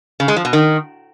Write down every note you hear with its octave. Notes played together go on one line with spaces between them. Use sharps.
C#3
G#3
F3
B2
D#3